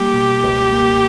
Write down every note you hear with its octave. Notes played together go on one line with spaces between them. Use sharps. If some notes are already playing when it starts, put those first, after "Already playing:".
Already playing: G3 A#3 G4
B2
C#2
A#3